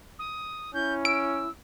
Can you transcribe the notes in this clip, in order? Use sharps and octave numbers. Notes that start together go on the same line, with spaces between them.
D#6
C#4 E4 G6
E6 D7